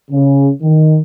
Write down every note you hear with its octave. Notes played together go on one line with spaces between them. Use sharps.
C#3
D#3